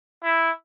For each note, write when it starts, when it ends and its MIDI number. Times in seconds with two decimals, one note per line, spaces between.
0.24 0.50 64